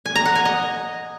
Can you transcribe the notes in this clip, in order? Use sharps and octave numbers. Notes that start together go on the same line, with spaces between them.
G#5
A#5
F#5
G#5
D#5